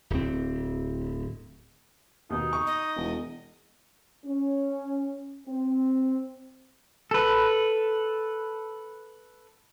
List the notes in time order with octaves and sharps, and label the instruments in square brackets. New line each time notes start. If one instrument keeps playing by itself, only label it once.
[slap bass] D1 C4
[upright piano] D#2 B2 [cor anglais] D#4
[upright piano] C#6
[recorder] D#5
[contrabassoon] E1
[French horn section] C#4
C4
[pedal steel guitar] A4 B4